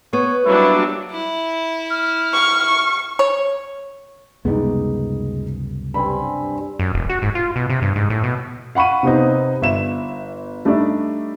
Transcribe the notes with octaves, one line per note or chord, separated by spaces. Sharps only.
B3 C#5
F#3 G3 A#3 D4 E4 F#4
E4
F6
C#6
C#5
C#2 F#2 C3 G3 G#3 B3 D#4
G2 C4 G#5 B5
F#2
E1
F#4
G#2
F4
B2
C3
G2
G#2
A2
B2
F5 F#5 B5 C#6 D#7
C3 B3 C4 D#4
G1 E5 E7
G3 A3 D4 D#4 D5 E5